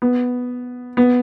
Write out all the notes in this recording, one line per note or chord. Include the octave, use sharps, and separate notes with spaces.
B3
B3